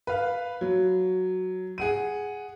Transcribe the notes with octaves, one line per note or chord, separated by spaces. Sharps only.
B4 F5
F#3
G#4 F#5 D#7